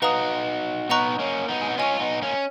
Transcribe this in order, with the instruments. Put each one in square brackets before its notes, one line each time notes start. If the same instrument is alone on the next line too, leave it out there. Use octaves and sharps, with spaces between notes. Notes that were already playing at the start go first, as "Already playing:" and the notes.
[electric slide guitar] D#4 F#4 [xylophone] B4 F5 A#5 D#6
[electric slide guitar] B3 D#4 [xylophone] D#5 F#5 A#5 C#6 F#6
[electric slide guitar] A#3 C#4
B3 D#4
G#4
F#4
[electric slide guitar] C#4 F4 [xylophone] D#5 G#5 C#6
[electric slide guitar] B3 D#4
A#3 C#4